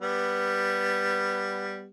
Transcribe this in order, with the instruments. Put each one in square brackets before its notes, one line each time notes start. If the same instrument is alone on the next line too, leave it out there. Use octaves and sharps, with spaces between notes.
[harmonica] G3 B3